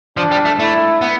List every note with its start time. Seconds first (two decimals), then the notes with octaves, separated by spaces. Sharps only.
0.17 F3 D4
0.32 G3
0.45 A3
0.59 A3 E4
1.01 B3